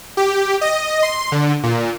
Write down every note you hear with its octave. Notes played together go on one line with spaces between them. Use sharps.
G4
D#5
C6
D3
A#2